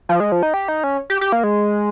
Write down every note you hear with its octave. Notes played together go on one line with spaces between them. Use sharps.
F3
G#3
F3
D#4
G4
D#4
C#4
G4
G4
A#3
G#3